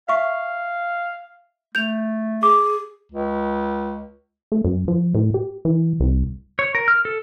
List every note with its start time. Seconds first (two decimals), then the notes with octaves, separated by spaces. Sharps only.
0.09 E5 F5 C#6
1.75 A3 G6 F7
2.43 G#4 D6
3.12 C#2
4.52 A3
4.64 F#2
4.88 F3
5.15 A2
5.34 G4
5.65 E3
6.00 C2
6.59 C#5
6.75 A#4
6.88 F6
7.05 A4